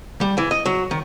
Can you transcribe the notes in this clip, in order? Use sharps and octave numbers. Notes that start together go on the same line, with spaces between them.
G3
E3
D#5
F#3
D#3